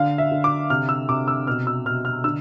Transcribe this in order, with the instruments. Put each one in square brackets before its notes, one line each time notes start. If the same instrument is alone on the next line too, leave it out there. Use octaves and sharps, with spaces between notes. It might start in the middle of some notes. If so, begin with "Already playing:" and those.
Already playing: [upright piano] D3 F5
E5
D3
D6
C3 F6
E6
C3 D6
E6
B2 F6
E6
B2 F6
F6
D3 E6